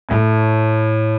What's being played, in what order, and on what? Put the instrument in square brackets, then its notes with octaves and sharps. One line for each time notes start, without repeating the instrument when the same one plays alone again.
[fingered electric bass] A2